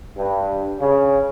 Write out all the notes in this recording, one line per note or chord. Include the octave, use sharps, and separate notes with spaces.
G2
C#3